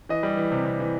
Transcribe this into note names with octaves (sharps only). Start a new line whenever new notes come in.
E3 D#5
G3
E3
C3
C3
E3